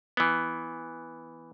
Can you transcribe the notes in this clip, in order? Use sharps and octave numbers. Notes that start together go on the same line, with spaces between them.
E3 B3